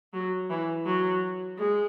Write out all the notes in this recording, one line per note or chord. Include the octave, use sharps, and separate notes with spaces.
F#3
E3
F#3
G#3